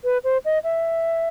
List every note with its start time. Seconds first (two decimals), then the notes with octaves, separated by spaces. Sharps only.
0.04 B4
0.24 C5
0.45 D#5
0.64 E5